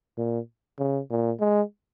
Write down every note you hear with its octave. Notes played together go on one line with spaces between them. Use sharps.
A#2
C#3
A#2
G#3